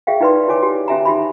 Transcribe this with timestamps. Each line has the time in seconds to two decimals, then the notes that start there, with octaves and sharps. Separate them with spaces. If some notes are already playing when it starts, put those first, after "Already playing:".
0.07 G#4 E5 F5 G5
0.21 D#4 E4 B4 D5 C6
0.48 E4 C#5 G#5 D6
0.63 G4
0.88 C#4 G4 E5 G#5 A#5
1.05 D#4 G4 E5 B5